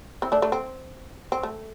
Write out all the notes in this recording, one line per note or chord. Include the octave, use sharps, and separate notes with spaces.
C4 E4
A3 D4
A3 D4
C4
C4
A3